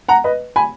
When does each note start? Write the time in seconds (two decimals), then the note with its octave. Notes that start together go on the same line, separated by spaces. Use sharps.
0.08 F#5 A#5
0.24 B4 D#5
0.56 G#5 B5